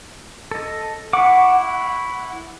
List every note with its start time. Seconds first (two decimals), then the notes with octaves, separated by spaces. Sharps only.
0.51 A4 D#5
1.13 E4 F#5 C#6 D6